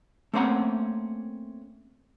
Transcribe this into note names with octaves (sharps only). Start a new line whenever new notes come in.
A3 A#3 C4 C#4 F#5 A#5